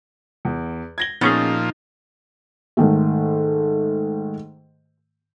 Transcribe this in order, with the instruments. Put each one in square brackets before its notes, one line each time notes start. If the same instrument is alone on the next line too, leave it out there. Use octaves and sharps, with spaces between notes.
[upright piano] E2
G#6 A#6 G7
[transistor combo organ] A#2 F3 [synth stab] B3 C#4 G#4 [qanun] D#4 [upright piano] A6
[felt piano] G#2 D#3 A3